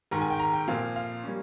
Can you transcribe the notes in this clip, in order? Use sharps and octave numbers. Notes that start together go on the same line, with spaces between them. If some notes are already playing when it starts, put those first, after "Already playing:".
G#2 D#3 G#3 A#5
G#5
G5
A#5
G5
A#2 F3 C4 F5
F5
G3 A#3 C#4